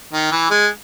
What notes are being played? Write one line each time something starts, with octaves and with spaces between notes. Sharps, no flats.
D#3
E3
G#3